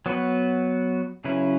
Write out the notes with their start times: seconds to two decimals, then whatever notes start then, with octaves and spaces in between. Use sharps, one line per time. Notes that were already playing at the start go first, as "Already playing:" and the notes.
0.06 F#3 B3 F#4 B4
1.24 C#3 F#3 C#4 E4 B4